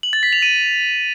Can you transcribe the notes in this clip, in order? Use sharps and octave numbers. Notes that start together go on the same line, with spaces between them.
F#7
A6
B6
F7
D#7